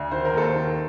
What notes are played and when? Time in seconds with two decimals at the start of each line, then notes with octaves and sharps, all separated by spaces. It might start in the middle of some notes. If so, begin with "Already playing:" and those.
Already playing: D2
0.11 D#3 C5
0.25 A#4
0.33 D#2 A4 C5
0.56 D#3